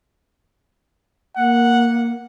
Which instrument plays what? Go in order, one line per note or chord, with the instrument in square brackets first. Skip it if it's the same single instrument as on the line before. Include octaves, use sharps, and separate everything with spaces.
[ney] A#3 [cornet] F#5